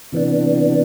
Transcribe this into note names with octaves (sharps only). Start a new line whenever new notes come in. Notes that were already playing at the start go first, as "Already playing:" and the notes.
C3 E3 B3 D4